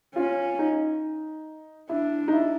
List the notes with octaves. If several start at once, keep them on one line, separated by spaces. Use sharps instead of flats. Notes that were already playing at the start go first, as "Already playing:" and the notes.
C#4 F4
D#4
D4 E4
D#4
E4